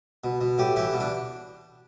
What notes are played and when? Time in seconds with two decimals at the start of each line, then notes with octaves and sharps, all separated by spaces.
0.24 B2
0.41 B2
0.58 A2 G4
0.76 E3 G4
0.93 B2
1.00 D4